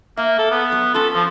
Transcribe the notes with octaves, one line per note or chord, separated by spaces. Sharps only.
A#3 E5
A4
B3
F#3
C#4 F4 A4
F3